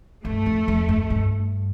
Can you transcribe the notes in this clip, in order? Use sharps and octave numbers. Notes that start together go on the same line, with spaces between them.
G2 A3
F2
F2
G2
G2